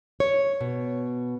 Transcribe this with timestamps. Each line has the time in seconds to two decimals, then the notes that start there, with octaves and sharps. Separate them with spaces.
0.20 C#5
0.61 B2